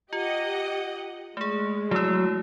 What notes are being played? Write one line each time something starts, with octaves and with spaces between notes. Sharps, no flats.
F4 G4 D#5 F#5
G#3 A3 G#4
F#3 A3 E4 E6